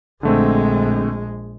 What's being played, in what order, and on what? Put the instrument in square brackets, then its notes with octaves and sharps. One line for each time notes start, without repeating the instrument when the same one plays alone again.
[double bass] A#1 G#3 [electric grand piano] D3 A3 C4